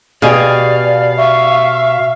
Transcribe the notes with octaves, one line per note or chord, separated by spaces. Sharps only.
B2 G4 G#4 D5 F5
E5 C#6